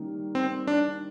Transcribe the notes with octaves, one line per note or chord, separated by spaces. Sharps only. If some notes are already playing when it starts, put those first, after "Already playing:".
Already playing: D#3 G3 A#3 C#4
C4
D4